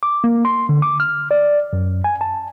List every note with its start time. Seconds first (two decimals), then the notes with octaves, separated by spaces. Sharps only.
0.03 D6
0.24 A#3
0.45 C6
0.69 D3
0.82 D6
1.00 F6
1.31 D5
1.73 F#2
2.04 G#5
2.21 A5